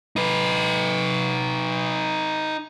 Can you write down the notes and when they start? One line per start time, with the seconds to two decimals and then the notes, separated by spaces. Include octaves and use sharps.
0.16 D#4 B4